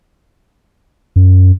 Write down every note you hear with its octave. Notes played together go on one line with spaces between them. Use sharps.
F#2